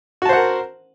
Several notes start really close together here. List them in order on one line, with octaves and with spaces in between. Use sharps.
F#4 A5 C5 F#5 A#4